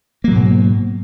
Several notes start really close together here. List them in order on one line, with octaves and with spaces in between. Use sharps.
A#3 F#3 B2 G#2